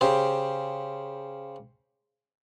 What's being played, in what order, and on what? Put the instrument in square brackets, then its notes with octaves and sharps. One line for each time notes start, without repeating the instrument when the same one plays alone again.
[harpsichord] C#3 G4 C5